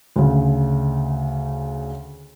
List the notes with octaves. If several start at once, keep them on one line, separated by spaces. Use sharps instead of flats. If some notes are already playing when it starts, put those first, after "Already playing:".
D2 C#3